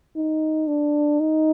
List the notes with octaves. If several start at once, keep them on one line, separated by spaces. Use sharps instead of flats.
D#4
D4
D#4